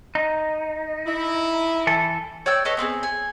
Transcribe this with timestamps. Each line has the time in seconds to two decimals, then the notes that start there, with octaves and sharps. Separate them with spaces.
0.15 D#4
1.06 E4
1.87 E3 A4
2.46 C#5 D5 G5 E6
2.65 A4 B4 C#5 D#5
2.77 B3 C4 D4 G#4
3.03 G#5